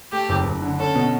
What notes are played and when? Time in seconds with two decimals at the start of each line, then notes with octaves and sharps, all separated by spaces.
0.12 A3 G4
0.29 F#1
0.46 F#1
0.62 D3
0.79 C#4 A4
0.95 B2